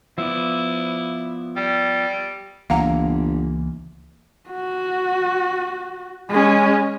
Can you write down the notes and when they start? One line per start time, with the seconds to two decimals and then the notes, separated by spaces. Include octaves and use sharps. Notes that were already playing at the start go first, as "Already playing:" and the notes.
0.18 F3 B3 E4 D5
1.56 G3
2.70 G1 C#2 E3 A#3 F5 F#5 A#5
4.50 F#4
6.30 G#3 C#4